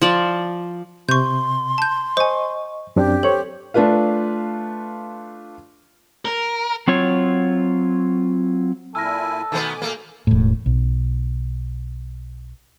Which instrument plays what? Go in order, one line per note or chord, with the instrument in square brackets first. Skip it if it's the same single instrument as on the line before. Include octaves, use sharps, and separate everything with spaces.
[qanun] F3 D5
[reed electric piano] C3 [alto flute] C6 [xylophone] C#6 G6
[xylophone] A5 G6
[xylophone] C5 G#5 [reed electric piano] D#5 C#6
[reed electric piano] F#2 C4 D4 [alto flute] G4
[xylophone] A4 [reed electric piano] C5 C#5
[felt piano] A3 D4 F4 B4 F5
[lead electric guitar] A#4
[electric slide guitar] F#3 C4 F4 C#5
[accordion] A#2 E4 G#5 [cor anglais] A4 [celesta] E6 F6 A#6
[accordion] B2 G#5 D6 [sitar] D#3 A3 B3
[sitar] A3 A#3
[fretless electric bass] E1 A2
B1